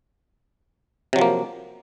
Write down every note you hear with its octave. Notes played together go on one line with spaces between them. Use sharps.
C3 F3 F#3 A#3